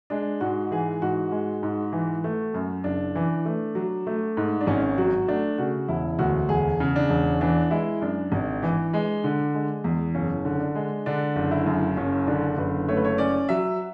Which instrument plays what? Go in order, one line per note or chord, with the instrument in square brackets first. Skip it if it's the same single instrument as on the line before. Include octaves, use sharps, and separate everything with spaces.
[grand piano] G#3 D4
G#2 F#4
E3 G#4
G#2 F#4
G#3
G#2
E3
A3
F#2
F#1 D4
E3
A3
F#3
A3
G#2
D4
G#1 C#4
F#3 F#4
A3 D4
C#3 F#4
E1 E4
D2 F#4
E1 G#4
C#3
D4
E1
C#4
E3 D4
G#3 E4
F#2 D4
G#1
E3
G#3
D3
G#3
E2
F#1 C#4
D3
D4
G#3
D3 D4
F#1
E4
F#2
F#1 C#4
D3 D4
F#1 B4
A3 C#5
B4
C#5
C#4 D5
F#3 E5